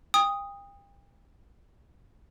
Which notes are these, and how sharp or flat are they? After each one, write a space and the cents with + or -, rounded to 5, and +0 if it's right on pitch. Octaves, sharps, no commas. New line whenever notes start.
G5 +35 D#6 +0